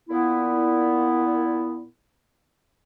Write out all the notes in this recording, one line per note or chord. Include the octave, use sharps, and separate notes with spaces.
A#2 B3 E4